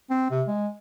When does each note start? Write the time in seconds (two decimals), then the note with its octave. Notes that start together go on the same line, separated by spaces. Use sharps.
0.10 C4
0.30 C3
0.48 G#3